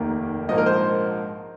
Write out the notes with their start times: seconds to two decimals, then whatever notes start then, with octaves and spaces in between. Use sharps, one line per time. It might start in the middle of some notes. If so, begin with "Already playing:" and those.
Already playing: F1 D#2 D#3 A#3
0.49 A#1 G#2 F3 A#3 D#5
0.58 A#4
0.66 C5